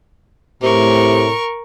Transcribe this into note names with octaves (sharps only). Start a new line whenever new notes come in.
A2 C3 A#4 C#6